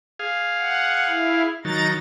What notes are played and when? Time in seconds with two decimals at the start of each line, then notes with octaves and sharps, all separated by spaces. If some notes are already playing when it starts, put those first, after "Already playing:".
0.19 G#4 F5
0.59 F#5
1.08 E4
1.65 D#3 F#3 D#4 A#5 A6